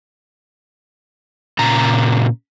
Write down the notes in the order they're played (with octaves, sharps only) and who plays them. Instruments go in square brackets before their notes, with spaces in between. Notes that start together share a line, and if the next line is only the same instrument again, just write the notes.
[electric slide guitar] A#2 C#3 A#5